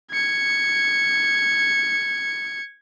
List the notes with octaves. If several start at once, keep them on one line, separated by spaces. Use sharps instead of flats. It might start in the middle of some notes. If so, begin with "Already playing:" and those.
G#6 C#7